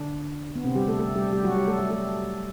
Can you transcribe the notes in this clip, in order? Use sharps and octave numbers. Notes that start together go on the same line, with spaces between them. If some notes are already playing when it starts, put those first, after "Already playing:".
Already playing: D3 D4
B3
C3 C4
G3 G4
A3 A4
A3 A4
G3 G4
G3 G4
F#3 F#4
G3 G4
A3 A4
G3 G4
A3 A4